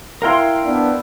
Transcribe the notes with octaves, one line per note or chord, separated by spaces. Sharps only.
E4 A#4 F5 G5 C6
B3 D4